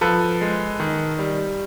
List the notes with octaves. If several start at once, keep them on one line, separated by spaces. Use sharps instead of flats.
F3 A4 B4
G#3
D#3
G3